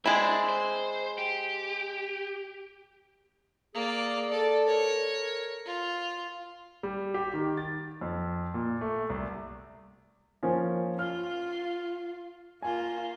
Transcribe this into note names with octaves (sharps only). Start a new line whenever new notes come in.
G#3 C4 D4 E4
C5
G4
A#3 G#4 D5
A4 D5
A#4 C#5
F4
G3
G4
D#3
A6
F2
A#2
A3
C2
F3 A#3 C#4
F4 F6
A#3 F4 G#5